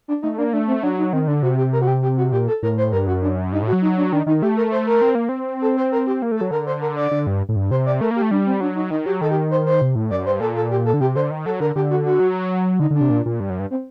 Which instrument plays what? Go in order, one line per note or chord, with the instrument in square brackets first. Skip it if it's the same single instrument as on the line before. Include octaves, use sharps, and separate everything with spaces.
[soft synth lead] D4
[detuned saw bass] A3 [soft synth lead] D#4
[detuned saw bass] A#3 [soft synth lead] D4
[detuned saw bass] A3 [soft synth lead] D4
[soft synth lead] C4
[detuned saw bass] F#3 [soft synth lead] D4
[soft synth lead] D#4
[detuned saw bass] D#3 [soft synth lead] C4
[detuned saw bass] D3 [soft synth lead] D4
[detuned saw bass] C3 [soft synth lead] F#4
[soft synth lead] G4
A#4
F#4
G4
G4
F#4
[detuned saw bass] A#2 [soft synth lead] G4
[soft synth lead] A4
[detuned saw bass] A2 [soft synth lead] A#4
[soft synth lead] C5
[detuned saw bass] G2 [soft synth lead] A#4
[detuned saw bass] F#2 [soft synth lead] F#4
[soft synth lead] D4
[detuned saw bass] G2 [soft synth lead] D#4
[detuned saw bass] A2 [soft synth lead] F#4
[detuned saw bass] F#3
[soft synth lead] D#4
D4
[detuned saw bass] D#3 [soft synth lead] D4
[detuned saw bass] D#3 [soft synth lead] D#4
[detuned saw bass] A3 [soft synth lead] G4
[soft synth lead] A#4
C5
A#4
[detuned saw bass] C4
A#3
C4
[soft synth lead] A4
C5
A#4
G4
[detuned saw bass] A#3
[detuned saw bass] A3 [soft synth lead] A4
[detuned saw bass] F#3
[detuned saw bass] D3 [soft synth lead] A#4
[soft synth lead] C5
A#4
D5
[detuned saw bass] D3
G2
A2
G2
[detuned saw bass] C3 [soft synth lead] C5
[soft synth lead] D5
[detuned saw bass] A3 [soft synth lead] A#4
[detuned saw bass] A#3
[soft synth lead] G4
[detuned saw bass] A3
[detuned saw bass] G3 [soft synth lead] D4
[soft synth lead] C4
[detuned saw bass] F#3 [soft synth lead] D4
[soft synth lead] D#4
[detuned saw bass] D#3 [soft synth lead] D#4
[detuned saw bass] F#3 [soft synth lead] G4
[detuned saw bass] D#3 [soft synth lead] A4
[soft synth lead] G4
C5
C5
[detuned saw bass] C3
A2
[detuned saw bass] F#2 [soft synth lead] D5
[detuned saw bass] G2 [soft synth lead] C5
[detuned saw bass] A#2 [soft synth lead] A4
[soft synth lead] A4
G4
A4
[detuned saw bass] D3
[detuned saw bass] C3 [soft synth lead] G4
[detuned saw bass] D3 [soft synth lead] C5
[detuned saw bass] D#3
[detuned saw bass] F#3 [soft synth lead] A4
[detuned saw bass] D3 [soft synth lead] A#4
[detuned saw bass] D3 [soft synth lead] G4
[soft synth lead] F#4
F#4
[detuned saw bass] F#3
[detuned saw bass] D3 [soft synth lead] D#4
[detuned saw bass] D3 [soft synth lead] D4
[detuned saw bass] C3
A#2
A#2
G2
F#2
G2
[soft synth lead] C4